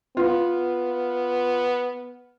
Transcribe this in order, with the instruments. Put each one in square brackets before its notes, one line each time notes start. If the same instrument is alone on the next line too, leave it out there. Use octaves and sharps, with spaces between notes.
[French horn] B3 [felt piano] F4